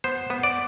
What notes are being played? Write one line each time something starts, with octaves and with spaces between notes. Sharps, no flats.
B3 C5
B3
D5